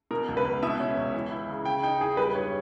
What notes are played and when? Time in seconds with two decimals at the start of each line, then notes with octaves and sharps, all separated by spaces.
0.11 B2 A#4
0.29 C#2
0.37 B4
0.45 C#2
0.63 B2 E5
0.80 C#4
0.97 C#2
1.14 E3
1.31 E4
1.49 C#3
1.65 C#3 G5
1.83 D#4 G5
2.01 E2 G#4
2.17 G3 B4
2.35 G2 C#5